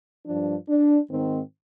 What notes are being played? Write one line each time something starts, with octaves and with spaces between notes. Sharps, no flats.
G2 F3 D4
D4
G#2 D#3 C4